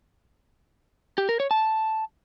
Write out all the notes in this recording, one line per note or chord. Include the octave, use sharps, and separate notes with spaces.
G4
A#4
C#5
A5